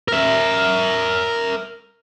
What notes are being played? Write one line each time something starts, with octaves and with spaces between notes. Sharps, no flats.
A#4 E5